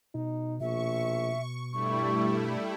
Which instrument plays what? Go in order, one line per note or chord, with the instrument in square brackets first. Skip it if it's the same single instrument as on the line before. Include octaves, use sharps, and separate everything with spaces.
[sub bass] B2 [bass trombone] D#4
[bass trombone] A#1 [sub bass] B2 [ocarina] E5 [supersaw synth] C#6
[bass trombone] G2 [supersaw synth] G3 A3 E4 [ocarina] C#6